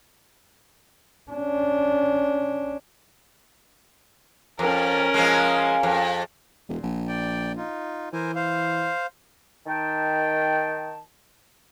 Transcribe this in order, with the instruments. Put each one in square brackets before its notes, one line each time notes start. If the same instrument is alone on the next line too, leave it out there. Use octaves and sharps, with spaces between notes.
[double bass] C#4 D4
[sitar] F2 [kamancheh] C#4 A#4
[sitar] F3 G#3
F2
[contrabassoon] E1 [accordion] A#2
[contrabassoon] A#1
[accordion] D5 G5
D#4 F4
[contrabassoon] E3 [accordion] A#4 C5 G#5
[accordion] C5 F5
[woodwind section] D#3 G5 A5